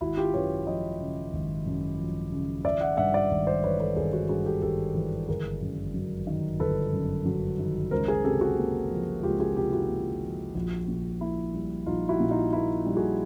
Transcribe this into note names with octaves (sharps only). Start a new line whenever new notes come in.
G#1 E4 F#4
F4 G4
F#2 B4 C#5
F3 C#5 D#5
C#3
G#1
F#2
F3
C#3
G#1 D5 E5
E5 F#5
G2 E5 F#5
D5 E5
G#1
C5 D5
E3 B4 C#5
A4 B4
G#1 G#4 A#4
F#4 G#4
G2 F#4 G#4
G4 A4
G#1 G4 A4
E3
G1 G#4 A#4
F#2
F#3
D#3
G1 A4 B4
F#2
F#3
D#3
C#2 A#4 C5
G#4 A#4
C3 G4 A4
F#4 G#4
A#3
F3
C#2 F4 G4
F#4 G#4
C3 F4 G4
E4 F#4
A#3
F3
A#1
A#2
A#3 E4
G3
A#1 D#4 F4
E4 F#4
A#2
D#4 F4
A#3 E4
G3
F#4 G#4